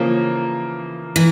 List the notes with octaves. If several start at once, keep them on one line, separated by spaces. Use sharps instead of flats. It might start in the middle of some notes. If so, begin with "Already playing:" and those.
Already playing: C#3 E3 F3 A#3
E3